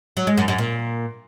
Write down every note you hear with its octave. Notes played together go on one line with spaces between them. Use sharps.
F#3
G#3
F#2
F#2
A#2